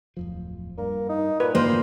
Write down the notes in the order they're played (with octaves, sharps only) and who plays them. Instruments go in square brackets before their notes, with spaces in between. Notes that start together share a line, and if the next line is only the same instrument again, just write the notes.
[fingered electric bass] D1 F2 F3
[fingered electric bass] G2 [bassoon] A#3
[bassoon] D#4
[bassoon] A#2 [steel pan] B4
[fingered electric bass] G#2 D3 [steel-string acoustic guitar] A#3 [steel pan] C5